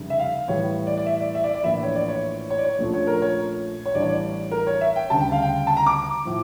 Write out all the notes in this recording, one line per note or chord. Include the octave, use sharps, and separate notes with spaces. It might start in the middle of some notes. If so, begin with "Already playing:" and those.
Already playing: F1 C#3 G3
E5
F5
A2 E3 G3 C#5
D5
D5
E5
D5
E5
D5
D5
A#1 A2 E3 A#3 E4 E5
C#5
D5
C#5
C#5
D5
C#5
A#1 A#2 F3 A3 C#4
C#5
A#4
C#5
C#5
A1 A2 G3 D4 D5
C#5
D5
A#4
C#5
E5
G5
D2 C#3 G3 A5
G5
F5
G5
A5
A#5
D6
A2 F3